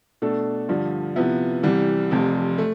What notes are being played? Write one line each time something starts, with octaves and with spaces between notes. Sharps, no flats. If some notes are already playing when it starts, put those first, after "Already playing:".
B2 A3 D4 A4
G2 D3 F3
C3 F3 B3 E4 B4
C2 C3 E3 G3
F1 F2 C3
A3